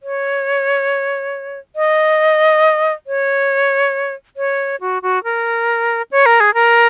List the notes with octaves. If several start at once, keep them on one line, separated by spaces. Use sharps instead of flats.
C#5
D#5
C#5
C#5
F#4
F#4
A#4
C#5
A#4
G#4
A#4